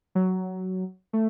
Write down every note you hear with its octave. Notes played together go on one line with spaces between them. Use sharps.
F#3
A3